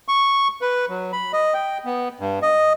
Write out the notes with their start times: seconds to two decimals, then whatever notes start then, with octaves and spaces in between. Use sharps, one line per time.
0.08 C#6
0.62 B4
0.89 F#3
1.13 B5
1.33 D#5
1.54 G5
1.85 B3
2.20 G2
2.42 D#5